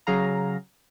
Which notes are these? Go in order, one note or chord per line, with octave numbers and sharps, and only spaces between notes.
C#3 F#3 G#4 F5 A#5